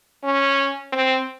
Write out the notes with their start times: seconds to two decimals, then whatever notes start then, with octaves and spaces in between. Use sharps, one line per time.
0.24 C#4
0.92 C4